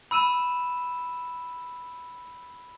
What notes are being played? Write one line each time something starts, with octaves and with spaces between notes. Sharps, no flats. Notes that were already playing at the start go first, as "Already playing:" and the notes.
B5 E6 D#7 E7